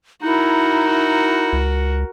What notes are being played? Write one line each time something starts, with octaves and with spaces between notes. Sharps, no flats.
D#4 E4 F#4 A#4
C#2